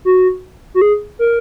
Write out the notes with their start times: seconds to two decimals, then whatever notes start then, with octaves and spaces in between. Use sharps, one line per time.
0.05 F#4
0.74 F#4
0.81 G#4
1.19 A#4